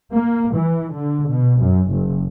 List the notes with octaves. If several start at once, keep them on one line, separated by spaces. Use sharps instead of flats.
A#3
E3
D3
B2
F#2
F#1